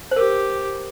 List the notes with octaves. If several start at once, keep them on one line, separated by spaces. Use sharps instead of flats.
C5
G4 A#4